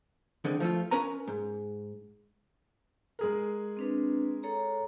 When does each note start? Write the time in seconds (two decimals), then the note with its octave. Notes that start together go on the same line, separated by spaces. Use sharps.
0.45 D3 D#3 G#3 C4
0.60 F3 A3 F4
0.91 C#4 A#4 B4 G#5 A#5
1.28 G#2
3.19 G#3 G#4 A#4
3.77 C4 D4 B4
4.43 A4 C#5 A#5